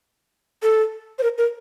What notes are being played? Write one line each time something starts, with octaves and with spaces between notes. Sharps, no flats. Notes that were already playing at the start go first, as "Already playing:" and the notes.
A4
C5
A#4
A#4